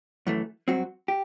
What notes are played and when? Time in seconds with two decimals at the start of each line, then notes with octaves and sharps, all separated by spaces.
0.27 F#2 E3 A3
0.68 G2 F#3 C4 F#4
1.08 G4